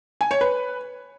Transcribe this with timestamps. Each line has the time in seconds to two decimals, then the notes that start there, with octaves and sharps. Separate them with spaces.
0.21 G#5
0.31 C#5
0.41 B4